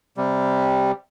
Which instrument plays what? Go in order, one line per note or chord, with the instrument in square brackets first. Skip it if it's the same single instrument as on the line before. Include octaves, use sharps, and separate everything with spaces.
[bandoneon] C3 G3